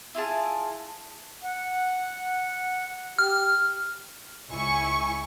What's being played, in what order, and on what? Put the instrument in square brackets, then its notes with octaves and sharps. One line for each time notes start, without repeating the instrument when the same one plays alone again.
[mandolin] E4 F4 G#4 A5
[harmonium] F#5
[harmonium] G4 [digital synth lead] F6
[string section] C#2 E4 G#5 C#6 C#7